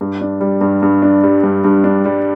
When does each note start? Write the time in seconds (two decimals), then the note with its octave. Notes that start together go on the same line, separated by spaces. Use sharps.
0.01 G2
0.21 D4
0.41 G3
0.61 G2
0.82 G2
1.02 D4
1.23 G3
1.43 G2
1.64 G2
1.84 D4
2.05 G3